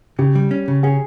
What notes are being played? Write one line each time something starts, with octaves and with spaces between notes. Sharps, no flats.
C#3 G4
G3
C#4
C#3
C#4 G#4